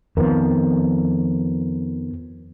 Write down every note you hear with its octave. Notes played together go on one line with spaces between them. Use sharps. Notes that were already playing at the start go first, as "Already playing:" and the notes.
F2 D#3 F3 B3 A#4